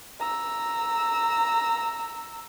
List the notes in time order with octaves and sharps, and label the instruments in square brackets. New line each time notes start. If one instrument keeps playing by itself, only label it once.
[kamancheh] A#5 E6